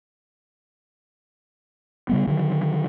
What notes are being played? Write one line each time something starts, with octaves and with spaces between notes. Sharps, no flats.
C#3 G3 B3
D3 D#3 F#3